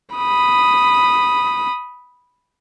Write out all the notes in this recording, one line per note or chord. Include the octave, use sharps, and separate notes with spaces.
B5 D#6